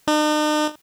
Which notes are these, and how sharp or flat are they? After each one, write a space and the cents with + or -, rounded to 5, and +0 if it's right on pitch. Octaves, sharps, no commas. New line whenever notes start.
D#4 -45